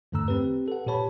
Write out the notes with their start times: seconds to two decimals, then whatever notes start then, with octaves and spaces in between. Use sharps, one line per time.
0.12 E2 G2 D3 A3 A#5 E6
0.28 C4 G4 B4
0.68 A4 F#5
0.86 A#2 G4 B4 C#5 A5 B5